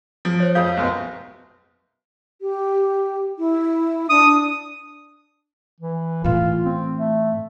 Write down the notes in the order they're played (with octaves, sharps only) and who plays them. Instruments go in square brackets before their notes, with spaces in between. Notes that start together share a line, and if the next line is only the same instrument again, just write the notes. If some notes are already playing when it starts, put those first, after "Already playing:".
[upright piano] F3
[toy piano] C5 C#5
[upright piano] F2 D#6 G6 [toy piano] F5
[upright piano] B1 F#2 B2
[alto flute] G4
E4
[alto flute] D4 [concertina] D#6
[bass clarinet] E3
[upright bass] A2 E3 [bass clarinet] F4
[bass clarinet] C4
A3